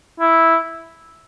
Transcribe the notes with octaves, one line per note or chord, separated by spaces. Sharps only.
E4